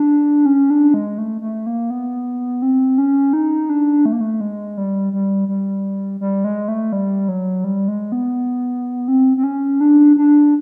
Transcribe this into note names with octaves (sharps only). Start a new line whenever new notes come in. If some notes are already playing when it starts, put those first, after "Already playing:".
Already playing: D4
C#4
D4
G#3
A3
A3
A#3
B3
C4
C#4
D#4
D4
A3
A#3
A3
G#3
G3
G3
G3
G3
G#3
A3
G3
F#3
G3
G#3
B3
C4
C4
C#4
D4
D4